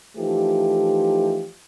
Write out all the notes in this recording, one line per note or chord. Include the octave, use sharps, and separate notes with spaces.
E3 F3 A3 D#4 G4